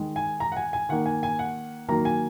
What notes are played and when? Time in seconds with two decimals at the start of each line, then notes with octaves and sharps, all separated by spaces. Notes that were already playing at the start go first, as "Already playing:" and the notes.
Already playing: D#3 G#3
0.16 G#5
0.40 A#5
0.52 F#5
0.56 G#5
0.73 G#5
0.89 D#3 A#3 F#5
1.06 G#5
1.23 G#5
1.39 F#5
1.88 D#3 F#3 A#3 A#5
2.05 G#5